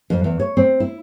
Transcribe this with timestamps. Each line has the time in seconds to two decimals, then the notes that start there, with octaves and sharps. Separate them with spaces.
0.10 F2
0.24 E2
0.40 C#5
0.57 C4
0.80 E4